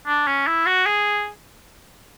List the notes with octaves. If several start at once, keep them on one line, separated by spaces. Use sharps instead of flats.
D4
C#4
E4
F#4
G#4